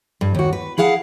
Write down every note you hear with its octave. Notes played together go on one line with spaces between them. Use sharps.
G2
D#2 F#4
B4
E4 G#4 F5 F#5 A5